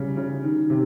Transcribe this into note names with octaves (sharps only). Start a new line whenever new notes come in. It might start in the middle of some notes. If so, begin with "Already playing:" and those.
Already playing: C#3 G3
C#3
D#3
C3